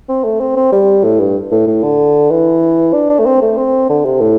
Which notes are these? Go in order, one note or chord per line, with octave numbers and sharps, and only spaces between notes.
C4
A3
C4
C4
G3
A2
G2
A2
A2
D3
E3
D4
D4
A3
C4
A3
C4
D3
C3
A2